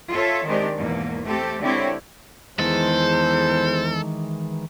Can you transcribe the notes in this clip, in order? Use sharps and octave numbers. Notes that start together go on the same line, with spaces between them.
F4 A4 C#5 E5
D#3 G#3 C4 D4 G4
E2 G#2 B2 A#3
A3 C4 G4 A4
D3 G#3 C4 E4 G4 C#5
E2 D#3 E3 G#3 A4 C5